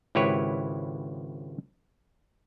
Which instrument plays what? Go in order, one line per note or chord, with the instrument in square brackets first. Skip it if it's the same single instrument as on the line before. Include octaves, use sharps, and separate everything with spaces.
[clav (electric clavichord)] G#1 C#2 E4 G4 B4 C#5